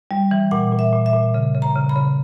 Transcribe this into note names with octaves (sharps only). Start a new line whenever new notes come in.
G3
E3
A#2 F#5
A#2
E5
A#2
E5
A#2
C#3
C#3
A#5
C#3
B5
C#3